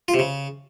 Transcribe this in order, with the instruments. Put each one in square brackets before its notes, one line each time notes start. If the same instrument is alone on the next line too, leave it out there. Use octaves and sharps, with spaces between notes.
[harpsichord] F4
C3
C#3